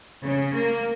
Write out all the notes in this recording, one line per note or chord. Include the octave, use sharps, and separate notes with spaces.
C#3
A#3